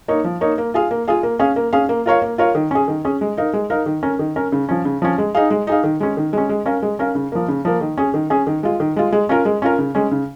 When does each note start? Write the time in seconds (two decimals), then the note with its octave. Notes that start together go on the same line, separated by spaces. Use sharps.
0.08 A#3 D#4 C#5
0.24 F3
0.41 A#3 D#4 C#5
0.58 A#3
0.74 F4 G#4 F5
0.91 A#3
1.08 F4 G#4 F5
1.23 A#3
1.39 C#4 G#4 F5
1.56 A#3
1.73 C#4 G#4 F5
1.89 A#3
2.06 F4 A#4 C#5 F5
2.22 A#3
2.38 F4 A#4 C#5 F5
2.55 D#3
2.71 C#4 G#4
2.88 D#3
3.05 C#4 G#4
3.21 G#3
3.37 D#4 A#4 F5
3.53 G#3
3.70 D#4 A#4 F5
3.86 D#3
4.03 C#4 A#4
4.19 D#3
4.36 C#4 A#4
4.52 C#3
4.69 F3 C#4
4.85 C#3
5.02 F3 C#4
5.18 G#3
5.35 D#4 G#4 F5
5.50 G#3
5.67 D#4 G#4 F5
5.84 D#3
6.00 G#3 C#4
6.17 D#3
6.33 G#3 C#4
6.49 G#3
6.66 C#4 A#4 F5
6.82 G#3
6.99 C#4 A#4 F5
7.15 C#3
7.32 F3 A#3
7.48 C#3
7.65 F3 A#3
7.81 D#3
7.98 C#4 G#4
8.14 D#3
8.30 C#4 G#4
8.47 D#3
8.63 G#3 F4
8.80 D#3
8.96 G#3 F4
9.12 G#3
9.29 C#4 F4 A#4
9.45 G#3
9.62 C#4 F4 A#4
9.79 C#3
9.95 G#3 C#4
10.11 C#3